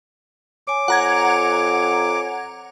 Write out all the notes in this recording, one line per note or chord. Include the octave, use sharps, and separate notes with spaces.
C#5 G#5 D6
F2 F#5 A#5 G#6